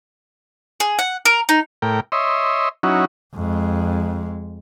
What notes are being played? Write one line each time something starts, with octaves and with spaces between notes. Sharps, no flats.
G#4
F#5
A#4
D#4
A2 A#4 G5
C#5 D#5 E5 C6
F#3 C#4 D#4 E4 F#4
F2 G#3